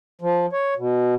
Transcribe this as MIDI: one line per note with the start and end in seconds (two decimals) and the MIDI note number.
0.21 0.46 53
0.53 0.74 73
0.77 1.15 47